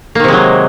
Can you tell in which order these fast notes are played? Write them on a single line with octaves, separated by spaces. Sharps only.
A#3 D#3 C3 G#3 F#3